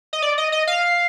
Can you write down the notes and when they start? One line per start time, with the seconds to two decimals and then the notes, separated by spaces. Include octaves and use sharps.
0.13 D#5
0.22 D5
0.38 D#5
0.52 D#5
0.67 F5